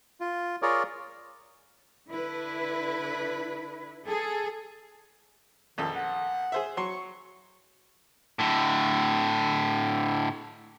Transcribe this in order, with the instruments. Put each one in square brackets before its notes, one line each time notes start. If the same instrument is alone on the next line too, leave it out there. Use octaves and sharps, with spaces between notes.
[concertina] F4
F4 G#4 A#4 C#5 D5
[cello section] D3 E4 B4
G#4 A4
[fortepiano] A#1 F2 A4 [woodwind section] A#2 D#3
[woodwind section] F#5
[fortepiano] G#4 C5 E5
[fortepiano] F#3 C6 [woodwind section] C#6
[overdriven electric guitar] A2 D3